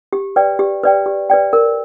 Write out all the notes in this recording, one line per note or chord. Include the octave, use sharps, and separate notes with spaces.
G4
B4 D5 G5
G4
B4 D5 G5
G4
B4 D5 G5
A#4